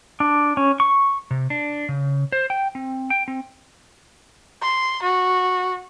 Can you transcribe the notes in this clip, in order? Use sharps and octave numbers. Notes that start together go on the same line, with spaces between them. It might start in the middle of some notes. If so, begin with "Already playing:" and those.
D4
C#4
C#6
C3
D4
C#3
C5
G5
C4
G5
C4
C6
F#4